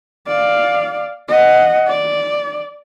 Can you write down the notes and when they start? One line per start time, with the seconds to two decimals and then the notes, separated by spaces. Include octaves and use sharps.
0.27 D5 F5
1.29 D#5 F#5
1.88 D5